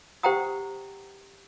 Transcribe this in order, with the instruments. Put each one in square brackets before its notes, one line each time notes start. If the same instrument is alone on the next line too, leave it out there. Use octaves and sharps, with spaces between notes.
[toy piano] G4 C5 F#5 G5 A#5 D#6